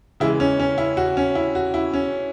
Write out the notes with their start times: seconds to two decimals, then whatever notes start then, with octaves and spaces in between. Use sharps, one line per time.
0.20 C#3 E3 G#3 E4
0.40 C#4
0.59 C#4
0.78 E4
0.97 F#4
1.17 C#4
1.35 E4
1.55 F#4
1.74 E4
1.94 C#4